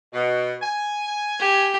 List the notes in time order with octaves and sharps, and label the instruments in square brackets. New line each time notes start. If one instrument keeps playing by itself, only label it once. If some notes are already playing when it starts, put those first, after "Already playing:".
[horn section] B2
G#5
[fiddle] G4